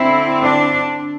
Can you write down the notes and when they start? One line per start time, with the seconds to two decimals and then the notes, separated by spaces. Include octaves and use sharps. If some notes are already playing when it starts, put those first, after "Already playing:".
Already playing: D3 C4 E4
0.42 D4